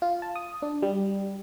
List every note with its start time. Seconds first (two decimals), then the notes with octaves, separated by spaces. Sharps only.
0.02 F4
0.22 A5
0.36 D#6
0.62 D4
0.82 G3